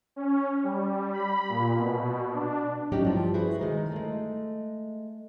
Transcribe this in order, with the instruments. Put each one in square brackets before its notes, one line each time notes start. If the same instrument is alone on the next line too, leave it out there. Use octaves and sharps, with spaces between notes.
[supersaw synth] C#4
G3
B5
A#2
B2
D4
[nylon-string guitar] A2 F#3 C#4 D#4 G4
G2 F3
E4 F#4 G#4 B4 C5
D#3 G#3 D#4
G#3 A3